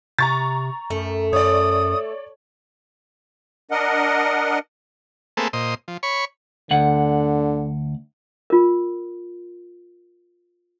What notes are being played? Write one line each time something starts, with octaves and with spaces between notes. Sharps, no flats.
C3 A#5 C#6 A6
F#2 A3
F#2 C#5 D5 D#6
D4 A#4 D#5 F#5
A3 A#3 C4 G#4 A4 B4
A#2 C5 D#5
F3
C#5 B5 C#6
D2 D3 F#5
F4 A#4